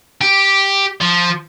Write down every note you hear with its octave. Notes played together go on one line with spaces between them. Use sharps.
G4
F3